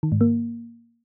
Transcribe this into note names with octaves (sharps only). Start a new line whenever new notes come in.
D#3
G#2
A#3